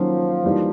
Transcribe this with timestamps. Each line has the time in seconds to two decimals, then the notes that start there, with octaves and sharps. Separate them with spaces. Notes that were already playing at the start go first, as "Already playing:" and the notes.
Already playing: D#3 F3 F#3 A#3 C#4 F4
0.44 E3 G3 A#3 D#4